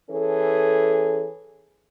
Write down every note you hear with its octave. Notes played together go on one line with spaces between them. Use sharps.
E3 C#4 G#4 A4